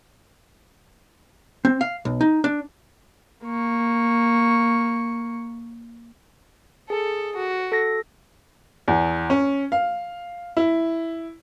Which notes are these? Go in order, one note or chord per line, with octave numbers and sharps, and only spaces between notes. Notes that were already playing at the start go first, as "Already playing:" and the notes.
C4
F5
B1
D#4
D4
A#3 C#6
G#4 A4
F#4
A4 A#6
E2
C#4
F5
E4